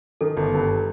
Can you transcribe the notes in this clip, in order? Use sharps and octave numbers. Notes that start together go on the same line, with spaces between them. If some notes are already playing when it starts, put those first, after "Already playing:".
D#3 A4
G1
G2